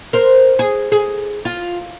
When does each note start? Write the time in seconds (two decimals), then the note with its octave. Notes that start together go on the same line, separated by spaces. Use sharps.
0.13 A#4 C5
0.59 G#4
0.92 G#4
1.45 F4